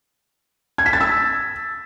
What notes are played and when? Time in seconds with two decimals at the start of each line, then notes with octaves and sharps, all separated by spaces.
0.78 G#6
0.86 B6
0.93 A6
1.01 E6